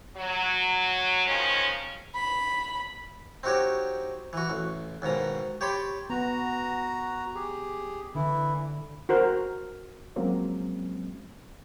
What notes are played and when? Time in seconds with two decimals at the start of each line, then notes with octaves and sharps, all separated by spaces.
0.16 F#3
1.27 D#3 F3 G#3 C#4
2.15 B5
3.43 C4 D#4 F#4 G4 C#5
4.33 E3 F#4
4.50 A1
5.02 D#2 G#2 B2 A#5
5.61 G4 C#5 A5 B5 C6
6.10 B3 F#4 A#5
7.35 G4 G#4
8.15 D3 E3 E4
9.09 F#4 A#4 C5
10.16 F3 F#3 G#3 A#3 C4 C#4